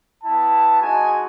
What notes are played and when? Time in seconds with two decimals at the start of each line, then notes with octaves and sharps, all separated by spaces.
0.23 B3 E4 A5
0.81 G#3 D#4 F#4 G#5